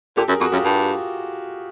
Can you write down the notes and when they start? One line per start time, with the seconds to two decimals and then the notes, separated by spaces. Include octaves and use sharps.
0.17 A#2 G4 A4
0.28 F#2 G#4 A#4
0.40 F2 F#4 G#4
0.52 F#2 F4 G4
0.64 G2